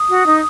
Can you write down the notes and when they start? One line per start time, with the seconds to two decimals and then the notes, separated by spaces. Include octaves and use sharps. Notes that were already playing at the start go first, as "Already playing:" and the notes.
Already playing: D#6
0.09 F#4
0.26 D#4